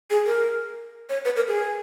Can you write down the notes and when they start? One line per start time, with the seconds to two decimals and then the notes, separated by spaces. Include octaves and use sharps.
0.10 G#4
0.26 A#4
1.09 C#5
1.25 B4
1.36 A#4
1.48 G#4